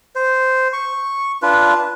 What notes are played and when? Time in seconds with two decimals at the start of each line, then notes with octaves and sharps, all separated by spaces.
0.16 C5
0.73 C#6
1.42 D4 F4 B4